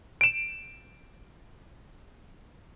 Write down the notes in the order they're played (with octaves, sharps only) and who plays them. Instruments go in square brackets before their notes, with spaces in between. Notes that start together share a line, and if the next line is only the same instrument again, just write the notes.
[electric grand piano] D7 E7